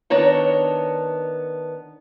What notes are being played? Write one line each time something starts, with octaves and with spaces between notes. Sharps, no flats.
D#3 B3 D4 C#5 A5 A#5